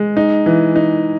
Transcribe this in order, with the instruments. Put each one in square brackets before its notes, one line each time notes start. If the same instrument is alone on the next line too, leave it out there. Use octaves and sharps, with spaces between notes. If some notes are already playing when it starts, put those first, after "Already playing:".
Already playing: [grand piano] G#3
D#4
E3
D#4